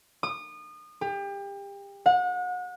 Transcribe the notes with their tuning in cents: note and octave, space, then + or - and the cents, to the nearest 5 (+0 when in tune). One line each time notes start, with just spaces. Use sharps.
D#6 -30
G4 +30
F#5 -35